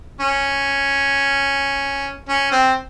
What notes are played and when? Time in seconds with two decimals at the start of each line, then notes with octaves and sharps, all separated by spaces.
0.21 C#4
2.29 C#4
2.52 C4